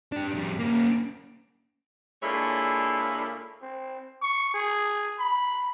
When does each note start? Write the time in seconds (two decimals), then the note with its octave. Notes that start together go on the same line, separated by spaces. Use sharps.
0.12 D4 G4
0.34 F2 G3
0.59 A#3 C#4
2.22 A#2 G#3 D4 E4 A4 C#5
3.62 C4
4.22 C#6
4.54 G#4
5.19 B5